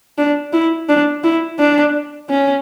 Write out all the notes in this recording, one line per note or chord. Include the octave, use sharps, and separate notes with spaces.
D4
E4
D4
E4
D4
C#4